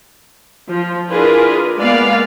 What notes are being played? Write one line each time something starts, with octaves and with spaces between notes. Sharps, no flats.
F3
D4 E4 F4 G#4 A#4 B4
G#3 A#3 B3 B4 D5 F5